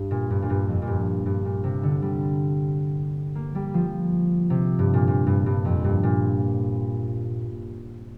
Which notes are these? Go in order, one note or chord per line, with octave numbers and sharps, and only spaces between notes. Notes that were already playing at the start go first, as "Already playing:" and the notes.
Already playing: G2
A#2
G2
A#2
G2
F2
A#2
G2
G2
A#2
C3
D3
G3
A#3
G3
F3
C3
G2
A#2
A#2
G2
G2
F2
G2
A#2